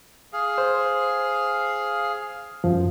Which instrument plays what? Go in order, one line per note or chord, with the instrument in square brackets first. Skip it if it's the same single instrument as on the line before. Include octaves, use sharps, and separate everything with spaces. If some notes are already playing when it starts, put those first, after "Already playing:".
[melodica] G#4 F5
[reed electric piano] C5
F#2 F3